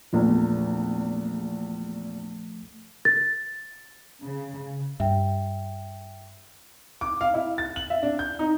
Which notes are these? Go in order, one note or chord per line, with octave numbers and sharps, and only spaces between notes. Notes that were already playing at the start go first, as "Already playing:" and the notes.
A#1 E2 F3 A3
A6
C#3
G2 E5 G5
D6
F5
E4
A6
F#7
E5
D4
G6
D#4